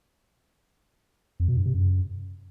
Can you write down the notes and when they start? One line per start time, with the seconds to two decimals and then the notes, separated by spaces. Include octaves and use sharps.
1.40 F2
1.48 B2
1.57 G2
1.66 C3
1.74 F#2